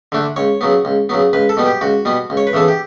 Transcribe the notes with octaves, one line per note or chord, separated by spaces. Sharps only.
D3 A3 D4
C#2 C#5
C#3 F#3 B3
C#2
C#3 F#3 B3
C#2 B4
A4
B2 G3 B3
G4
C#2 F#4
B2 G3 B3
C#2
C#5
B4
C#3 E3 B3 A4
G4